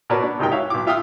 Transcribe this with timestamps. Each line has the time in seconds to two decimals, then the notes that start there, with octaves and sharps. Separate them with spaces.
0.10 B2 A#4 B4 C#5 D5 A5
0.23 B3 D4
0.39 C#2 C3 D#4 A#4 G5
0.52 F#4 C#5 E5 F5
0.70 B1 D6
0.87 F4 E5 F5 G5 D#6 F6